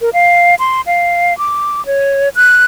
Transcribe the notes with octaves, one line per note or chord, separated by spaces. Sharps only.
A#4
F5
C6
F5
D6
C#5
F#6